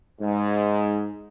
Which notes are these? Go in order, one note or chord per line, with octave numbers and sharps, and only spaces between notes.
G#2